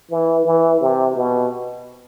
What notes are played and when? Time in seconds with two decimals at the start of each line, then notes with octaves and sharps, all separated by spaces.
0.11 E3
0.46 E3
0.81 C3
1.16 B2